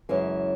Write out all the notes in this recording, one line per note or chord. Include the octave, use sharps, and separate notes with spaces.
F#2 C#3 E3 G#3